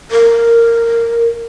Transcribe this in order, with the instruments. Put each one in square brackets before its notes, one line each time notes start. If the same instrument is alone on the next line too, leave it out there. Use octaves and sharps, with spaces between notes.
[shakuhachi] A#4